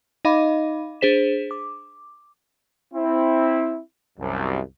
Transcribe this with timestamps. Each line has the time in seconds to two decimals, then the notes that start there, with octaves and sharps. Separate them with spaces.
0.25 D#4 D#5 F5 B5 D6
1.01 D4 G#4 C5 B6 E7
1.51 D6
2.94 C4 E4
4.19 C2 F#2